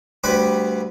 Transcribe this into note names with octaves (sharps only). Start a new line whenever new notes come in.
D2 G3 B4 B5 D6